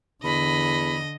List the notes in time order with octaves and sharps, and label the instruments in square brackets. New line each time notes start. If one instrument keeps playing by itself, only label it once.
[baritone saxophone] E2 [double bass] D3 [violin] D#5 [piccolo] B5